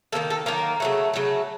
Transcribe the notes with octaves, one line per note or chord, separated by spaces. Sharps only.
D#3 F#3 A#3 A4
A4
D#3 F#3 A#3 A#4
C#3 F#3 A3
C#3 F#3 A3